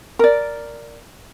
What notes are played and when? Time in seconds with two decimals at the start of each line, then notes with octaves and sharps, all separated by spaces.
0.19 A#4 D5